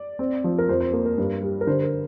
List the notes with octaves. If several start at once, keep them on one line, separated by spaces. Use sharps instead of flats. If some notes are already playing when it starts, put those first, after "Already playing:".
Already playing: D5
C4
F3
A#4
F2 C5
C5
A#3 A#4
A#4
G2
G3
A#4
D3 C5
A#4